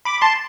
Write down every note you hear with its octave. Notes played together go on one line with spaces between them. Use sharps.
B5 D6
A5 C6